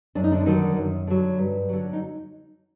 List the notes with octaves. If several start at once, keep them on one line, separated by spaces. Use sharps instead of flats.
F#2 D4
D#4
D3 D4
D3 D#3 F#3 D#4
F#2
D3 F#3
G2
D3 F#3
D#4